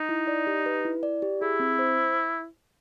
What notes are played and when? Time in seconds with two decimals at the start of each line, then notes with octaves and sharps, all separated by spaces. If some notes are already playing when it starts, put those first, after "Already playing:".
Already playing: D#4
0.09 E4
0.27 D5
0.47 G4
0.66 B4
0.85 E4
1.03 D5
1.22 G4
1.41 E4 G#4
1.60 C4
1.79 C5